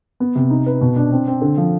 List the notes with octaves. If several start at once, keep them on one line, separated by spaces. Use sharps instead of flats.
B3
C3
D#4
B4
B2
D4
C4
C4
D3
F3